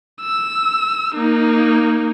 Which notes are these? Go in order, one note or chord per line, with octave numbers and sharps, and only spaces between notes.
E6
A#3 D#4